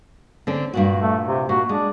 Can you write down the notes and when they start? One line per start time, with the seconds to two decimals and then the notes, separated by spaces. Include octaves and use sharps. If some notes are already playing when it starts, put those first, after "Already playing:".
0.47 D3 C4 C#4
0.73 G2 A#2 F#4
1.00 A3
1.26 C3
1.49 A#2 F#4
1.69 G#3 D4